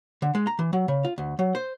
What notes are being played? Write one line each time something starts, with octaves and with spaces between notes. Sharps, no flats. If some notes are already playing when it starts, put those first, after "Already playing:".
D3
G#3
A#5
E3
F#3
C#3
F4
D2
F#3
C5